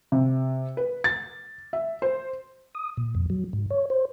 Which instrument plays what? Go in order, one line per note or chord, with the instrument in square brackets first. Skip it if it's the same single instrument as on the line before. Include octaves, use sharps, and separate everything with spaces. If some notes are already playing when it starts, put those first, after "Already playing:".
[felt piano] C3
B4
A6
E5
C5
[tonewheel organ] D#6
A#2
F2
F#3
G#2
C#5
C5